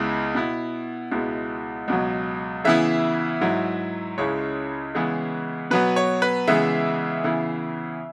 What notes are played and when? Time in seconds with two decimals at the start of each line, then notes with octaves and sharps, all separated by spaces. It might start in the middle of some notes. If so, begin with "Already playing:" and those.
Already playing: C#2 C#3 G#3 B3 E4
0.35 B2 B3 E4
1.11 C#2 B2 G#3 B3 E4
1.88 C#2 B2 F#3
2.64 C#3 E3 B3 E4 E5
3.41 G#2 F#3 E4
4.18 C#2 C#3 G#3 C#4 E4 C#5
4.95 C#3 E3 G#3 B3 E4
5.71 B2 F#3 B3 B4
5.96 C#5
6.22 B4
6.47 C#3 E3 G#3 B3 E5
7.24 C#3 E3 B3 E4